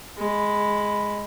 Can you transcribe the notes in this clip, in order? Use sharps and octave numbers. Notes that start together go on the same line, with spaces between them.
G#3 B5